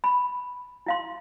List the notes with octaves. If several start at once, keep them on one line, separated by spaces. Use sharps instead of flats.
B5
E4 F5 C6